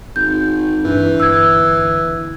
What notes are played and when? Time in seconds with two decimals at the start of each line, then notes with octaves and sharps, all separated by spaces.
0.16 G#1 G6
0.85 G2 E3
1.20 G1 E6 G#6